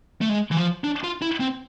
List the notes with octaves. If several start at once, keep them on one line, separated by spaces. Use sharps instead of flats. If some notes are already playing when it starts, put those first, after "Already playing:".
A3
G#3
E3
F3
D4
F4
E4
C4